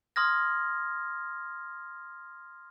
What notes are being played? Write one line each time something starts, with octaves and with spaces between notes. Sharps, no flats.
C6 D#6 F6 G#6 A#6